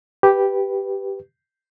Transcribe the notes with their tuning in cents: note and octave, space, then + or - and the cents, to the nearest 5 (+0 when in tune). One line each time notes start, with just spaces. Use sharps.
G4 +0 B4 +0